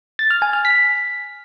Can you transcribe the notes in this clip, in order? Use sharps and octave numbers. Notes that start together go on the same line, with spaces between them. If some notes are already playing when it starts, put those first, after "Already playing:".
A6
F6
G#5
F6
B6